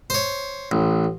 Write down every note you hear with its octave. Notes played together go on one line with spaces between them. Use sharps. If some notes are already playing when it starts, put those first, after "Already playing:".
C5 C#5
A1